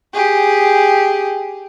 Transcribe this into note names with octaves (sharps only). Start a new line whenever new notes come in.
G4 G#4